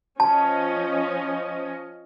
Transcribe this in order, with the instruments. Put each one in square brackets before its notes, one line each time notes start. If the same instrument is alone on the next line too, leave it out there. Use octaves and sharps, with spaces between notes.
[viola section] F3 C#4 D#5 [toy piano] A5